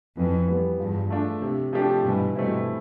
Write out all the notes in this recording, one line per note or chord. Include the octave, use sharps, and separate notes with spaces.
F2 E3
G3 B3
E2 G2 F3
A3 D4 F4
C3
F3 A3 D4 G4
G2 B2 E3
G2 B2 A3 C4 E4